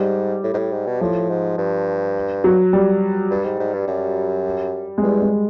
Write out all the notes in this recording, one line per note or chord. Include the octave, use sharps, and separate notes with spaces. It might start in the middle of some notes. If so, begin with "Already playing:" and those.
Already playing: G#2 G3
A2
G#2
A2
G#2
B2
A2 F3
G#2
G2
F#3
G3
G2
G#2
G#2
G2
F#2
G#3
E2 G3
G#3